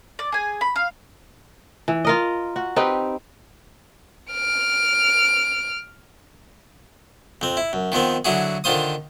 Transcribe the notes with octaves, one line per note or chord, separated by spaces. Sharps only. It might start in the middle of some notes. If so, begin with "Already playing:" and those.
D5
G#4 G#5
B5
F5
E3
F4 A#4 D#5
F#4
C4 D#4 G4 B4
F6 D7
F2 C4
E4
F#2
D#3 F3 B3 C4
D3 F#3 E4 F#4 G#4
D3 D#3 F4 C5 D#6